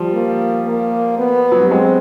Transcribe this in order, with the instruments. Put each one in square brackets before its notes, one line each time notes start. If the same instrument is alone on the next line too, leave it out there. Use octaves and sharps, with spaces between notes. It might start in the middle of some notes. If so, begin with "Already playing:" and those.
Already playing: [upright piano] F3 G3
[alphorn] A#3
A#3
B3
[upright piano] F#3
G3
[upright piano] F#3 G#3 [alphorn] C4